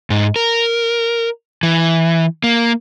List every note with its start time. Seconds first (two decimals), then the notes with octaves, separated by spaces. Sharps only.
0.10 G#2
0.36 A#4
1.63 E3
2.44 A#3